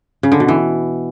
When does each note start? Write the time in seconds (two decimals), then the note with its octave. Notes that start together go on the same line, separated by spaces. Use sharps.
0.23 C#3
0.32 D3
0.40 B2
0.48 E3